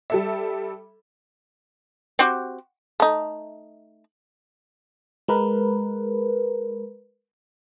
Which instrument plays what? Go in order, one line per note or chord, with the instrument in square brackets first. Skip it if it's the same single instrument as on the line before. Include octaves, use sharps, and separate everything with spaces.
[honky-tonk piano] G3 A4 E5
[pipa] C4 F#4 G4
[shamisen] A3 D#4
[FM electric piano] G#3 A#4 B4